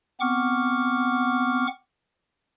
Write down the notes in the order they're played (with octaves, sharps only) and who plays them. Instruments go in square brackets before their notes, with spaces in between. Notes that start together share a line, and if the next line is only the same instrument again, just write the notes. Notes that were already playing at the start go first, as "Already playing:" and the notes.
[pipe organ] B3 C4 F#5 C#6 D6 F6